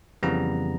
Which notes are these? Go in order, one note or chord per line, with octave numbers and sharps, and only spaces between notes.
F2 C#3 E3 G3 B3 A#5